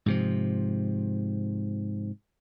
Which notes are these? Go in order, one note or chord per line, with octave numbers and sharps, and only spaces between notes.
G#2 C3 F3